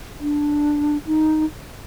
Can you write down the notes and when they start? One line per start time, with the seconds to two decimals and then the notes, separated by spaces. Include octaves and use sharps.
0.20 D4
1.07 D#4